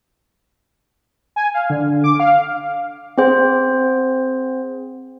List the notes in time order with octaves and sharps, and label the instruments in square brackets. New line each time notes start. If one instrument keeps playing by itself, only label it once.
[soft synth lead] G#5
F5
D3
D6
F5
[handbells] C4 G#4 C5 F#5